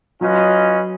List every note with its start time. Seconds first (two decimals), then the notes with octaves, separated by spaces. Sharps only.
0.21 F#3 C#4 F4 B4 D#5